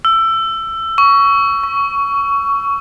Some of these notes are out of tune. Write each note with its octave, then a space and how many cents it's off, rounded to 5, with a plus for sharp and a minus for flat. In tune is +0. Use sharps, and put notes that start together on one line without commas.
E6 +20
C#6 +20
C#6 +10